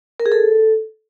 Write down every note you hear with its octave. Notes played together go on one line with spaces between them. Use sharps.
A#4
G#4
A4